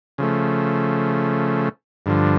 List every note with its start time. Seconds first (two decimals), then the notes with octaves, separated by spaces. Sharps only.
0.18 C#3 F3 A3
2.06 G2 D3 F3